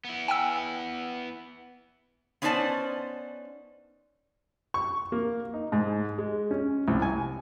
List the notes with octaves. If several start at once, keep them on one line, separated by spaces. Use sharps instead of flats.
B3 E4
G5 G#5 E6
B3 C#4 D#4 C5 D5 A5
C#6
A#3
D#4
G#2
G#3
C#4
C2
G#5